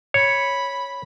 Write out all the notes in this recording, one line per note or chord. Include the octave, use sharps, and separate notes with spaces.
C#5 B5